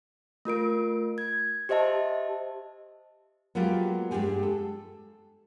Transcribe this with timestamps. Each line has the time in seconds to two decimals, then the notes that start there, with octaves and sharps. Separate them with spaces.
0.45 A3 F4 A#4 D7
1.18 G#6
1.69 G4 C5 D#5 E5 A5
3.55 F#3 G#3 A#3 B3 F4 G4
4.11 G2 B2 G#3 G4 G#5
4.43 A4